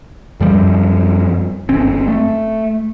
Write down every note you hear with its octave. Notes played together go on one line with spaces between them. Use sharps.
F#2 F3 G3
G1 C4 C#4
A3